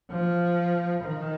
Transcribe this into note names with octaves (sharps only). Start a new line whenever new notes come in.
F3
D#3